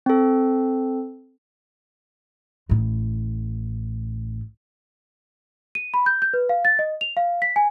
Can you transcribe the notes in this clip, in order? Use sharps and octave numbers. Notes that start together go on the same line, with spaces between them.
C4 A4
A1 A2
D#7
B5
G6
G6
B4
F5
A6
D#5
F7
F5
B6
G#5